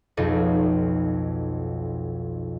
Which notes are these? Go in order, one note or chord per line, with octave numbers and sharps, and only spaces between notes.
B1 F2 D#4 F4